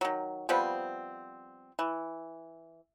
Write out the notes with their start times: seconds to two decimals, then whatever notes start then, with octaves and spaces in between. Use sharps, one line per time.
0.01 D#3 F#3
0.49 F3 G3 B3 C4
1.79 E3